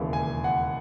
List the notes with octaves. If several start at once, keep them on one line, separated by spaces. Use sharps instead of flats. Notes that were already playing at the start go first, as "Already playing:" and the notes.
Already playing: E1 D#2 C#3 E3
G#5
F#5